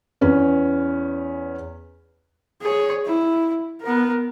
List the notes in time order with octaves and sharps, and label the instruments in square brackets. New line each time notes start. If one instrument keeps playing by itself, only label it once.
[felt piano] E2 C#4 B4
[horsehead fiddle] G#4 C#5
E4
B3 A#4